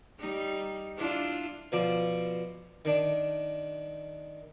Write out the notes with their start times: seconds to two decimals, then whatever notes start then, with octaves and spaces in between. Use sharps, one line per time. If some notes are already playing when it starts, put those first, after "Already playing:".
0.20 G3 D#4
0.98 D4 E4 F4
1.72 B2 F3 D5
2.85 D#3 D4